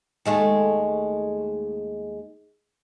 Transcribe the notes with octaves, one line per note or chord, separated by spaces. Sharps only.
D#2 G#3 A3